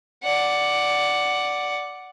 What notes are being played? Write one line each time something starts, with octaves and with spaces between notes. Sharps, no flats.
D5 F#5